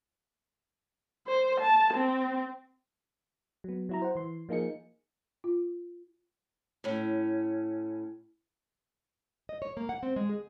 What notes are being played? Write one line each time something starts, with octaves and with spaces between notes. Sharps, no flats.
C5
A5
C4
F#3 B3
F#3 E4 A#5
C5 F#5
E3 C6
F3 A#3 D#4 G#4 C#7
F4
A2 C#4
D#5
C#5
A#3
F#5
C4
G#3
G#4